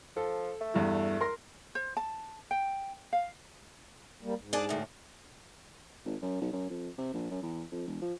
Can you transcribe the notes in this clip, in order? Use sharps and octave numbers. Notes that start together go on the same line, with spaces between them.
F3 A4
A3
E2 G2 E3
A#4 C6 A#6
C5
A5
G5
F5
G3 A#3
G#2
D4 G#4 D5
D2 A2
G#1
F#2
B1
F#2
F2
C3
A#1
F#2
E2
F2
E1
F3